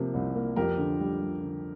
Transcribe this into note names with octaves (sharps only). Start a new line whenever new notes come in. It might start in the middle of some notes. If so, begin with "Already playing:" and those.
Already playing: C3 F3 A#3
C2
A#3
F2 G4 A#4
D3
G3
G3
D3